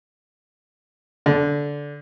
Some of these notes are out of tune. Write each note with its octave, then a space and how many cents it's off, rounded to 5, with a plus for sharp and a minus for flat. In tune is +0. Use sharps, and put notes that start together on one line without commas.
D3 -15